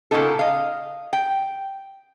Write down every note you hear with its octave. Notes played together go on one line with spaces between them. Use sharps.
A#2 C#3 A#3 B3 D#4 A4
D#5 F5
G5